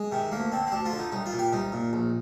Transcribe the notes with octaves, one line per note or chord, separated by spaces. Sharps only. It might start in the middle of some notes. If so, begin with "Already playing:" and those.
Already playing: G#3
C3 D#3
D2 A#3
D3 C4
C4
D2 D4
F4
D3
D#4
C2 D#4
F4
A#2
G4
C2 D#4
A#2
A#1